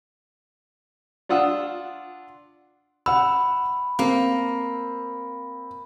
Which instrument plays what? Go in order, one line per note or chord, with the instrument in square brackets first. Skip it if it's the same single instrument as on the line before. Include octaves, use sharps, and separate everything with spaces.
[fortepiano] D4 F4 F#5 D#6 E6
[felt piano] F#5 E6 [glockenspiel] B5
[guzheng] A#3 [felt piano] C4